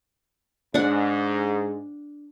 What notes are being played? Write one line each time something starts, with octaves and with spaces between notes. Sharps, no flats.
G#2 D4 F#5